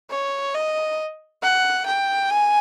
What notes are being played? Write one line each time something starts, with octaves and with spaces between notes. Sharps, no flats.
C#5
D#5
F#5
G5
G#5